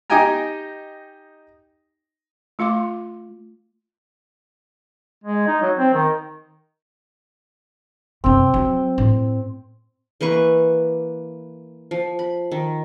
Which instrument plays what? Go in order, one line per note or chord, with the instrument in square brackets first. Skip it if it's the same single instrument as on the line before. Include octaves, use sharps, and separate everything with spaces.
[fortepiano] D#4 G4 D#5 G5 G#5 A#5
[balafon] A3 F4 F5 C6 D6
[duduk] G#3
D#4
F#3
C4
D#3
[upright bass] F#2 C3 [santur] C4
[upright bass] F#3
A2
[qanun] E3 A#3 B4 C#6
F3
B5
D#3